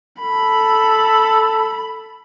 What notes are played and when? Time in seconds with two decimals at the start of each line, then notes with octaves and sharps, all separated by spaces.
0.20 A4 B5